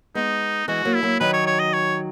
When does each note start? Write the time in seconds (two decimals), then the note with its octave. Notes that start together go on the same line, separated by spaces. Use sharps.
0.15 G#3 B3 D#4
0.68 E3 G#3 F#4
0.85 F#3 A#3
0.94 E4
1.03 F#3 A#3
1.20 D#3 F#3 B4
1.33 C#5
1.46 C#5
1.59 D#5
1.73 C#5